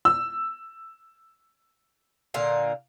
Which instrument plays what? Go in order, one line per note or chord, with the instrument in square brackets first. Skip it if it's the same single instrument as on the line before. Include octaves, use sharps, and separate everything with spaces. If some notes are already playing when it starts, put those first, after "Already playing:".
[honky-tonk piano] E6
[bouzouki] A#2 D3 F5